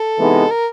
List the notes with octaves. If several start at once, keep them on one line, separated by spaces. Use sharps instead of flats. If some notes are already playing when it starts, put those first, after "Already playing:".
Already playing: A4
C3 E3 G#3 B3 D#4
A#4